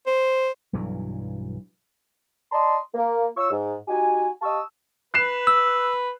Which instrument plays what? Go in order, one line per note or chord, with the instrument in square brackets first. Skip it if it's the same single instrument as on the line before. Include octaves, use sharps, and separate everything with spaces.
[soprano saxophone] C5
[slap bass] B1 G2 E3 F#3
[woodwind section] D5 D#5 A5 A#5 C6
A#3
F4 C#5 C#6 E6
G#2
D#4 F#4 G4 G#5
G4 D#5 F5 A5 C#6 E6
[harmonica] B4 [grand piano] F#6 C7 E7
[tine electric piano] E6